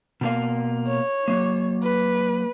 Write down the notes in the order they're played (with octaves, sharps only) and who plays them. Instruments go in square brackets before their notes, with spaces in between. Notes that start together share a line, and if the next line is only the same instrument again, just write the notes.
[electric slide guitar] B2 A#3 F5
[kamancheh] C#5
[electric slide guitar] F#3 A#3
[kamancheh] B4